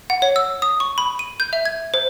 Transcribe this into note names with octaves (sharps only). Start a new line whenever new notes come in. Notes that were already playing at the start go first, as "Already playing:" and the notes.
F#5
C#5
E6
D#6
C#6
B5
D#7
G6
E5
G#6
C5